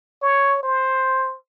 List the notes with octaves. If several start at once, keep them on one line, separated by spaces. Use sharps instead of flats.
C#5
C5